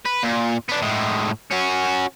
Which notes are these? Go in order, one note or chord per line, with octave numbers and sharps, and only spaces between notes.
B4
A#2
B3 D4
A2 G#3
C#4 F#4